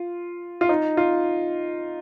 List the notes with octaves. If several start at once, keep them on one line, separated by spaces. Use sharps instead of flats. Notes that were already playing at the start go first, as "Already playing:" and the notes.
Already playing: F4
F4
D#4
F4